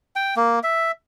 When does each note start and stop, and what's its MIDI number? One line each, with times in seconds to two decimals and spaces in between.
0.16 0.35 79
0.36 0.59 58
0.63 0.91 76